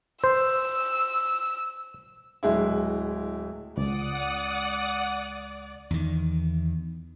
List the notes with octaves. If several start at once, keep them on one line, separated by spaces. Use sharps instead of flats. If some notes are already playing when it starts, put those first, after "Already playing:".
C5 E6
D1 G#3 E4
C#2 D5 F#5 D#6
E2 D#3